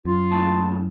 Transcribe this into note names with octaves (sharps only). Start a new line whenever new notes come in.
F#2 F4
D#2 A2 C#3 A5